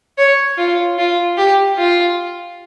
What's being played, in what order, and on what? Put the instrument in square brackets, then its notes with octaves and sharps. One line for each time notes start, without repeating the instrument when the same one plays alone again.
[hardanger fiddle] C#5
F4
F4
G4
F4